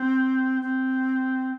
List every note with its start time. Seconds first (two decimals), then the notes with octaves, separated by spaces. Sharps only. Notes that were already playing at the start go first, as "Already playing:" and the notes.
Already playing: C4
0.62 C4